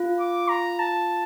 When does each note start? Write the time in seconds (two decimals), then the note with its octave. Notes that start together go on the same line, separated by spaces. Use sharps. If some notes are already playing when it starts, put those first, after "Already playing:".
Already playing: F4
0.20 D6
0.49 A#5
0.80 A5